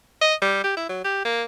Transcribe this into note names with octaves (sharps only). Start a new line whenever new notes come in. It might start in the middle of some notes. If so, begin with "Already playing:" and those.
D#5
G3
G4
E4
F#3
G4
A#3